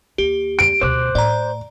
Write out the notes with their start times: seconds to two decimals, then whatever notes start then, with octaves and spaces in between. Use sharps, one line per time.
0.18 D#2 G4
0.59 D7
0.81 D2 B2 C5 D6 F#6
1.15 A2 D5 A#5